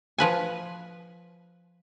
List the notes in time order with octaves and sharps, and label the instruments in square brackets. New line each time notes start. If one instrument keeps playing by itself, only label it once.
[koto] F3 B4 G#5